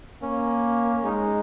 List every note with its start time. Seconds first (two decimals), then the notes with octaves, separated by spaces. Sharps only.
0.22 A#3 C#4
1.04 G#3 D#4